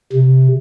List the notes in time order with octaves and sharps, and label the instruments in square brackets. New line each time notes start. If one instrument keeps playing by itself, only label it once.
[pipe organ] C3